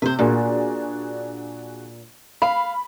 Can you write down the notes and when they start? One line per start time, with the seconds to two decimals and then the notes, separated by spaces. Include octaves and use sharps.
0.02 C3 B4 C5
0.19 A#2 D4 F#4 G#4
2.42 F5 B5